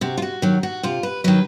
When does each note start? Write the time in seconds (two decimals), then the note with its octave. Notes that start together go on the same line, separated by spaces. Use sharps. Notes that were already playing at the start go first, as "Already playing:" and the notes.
0.01 C3 F#4
0.17 F4
0.22 F#4
0.42 D#3 F#3
0.63 F#4
0.83 C3 F4
1.03 B4
1.24 D#3 F#3 B4